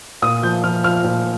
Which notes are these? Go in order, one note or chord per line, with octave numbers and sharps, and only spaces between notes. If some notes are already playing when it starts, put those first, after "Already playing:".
A#2 D#6
F3 G6
F3 F6
F3 F6
A#2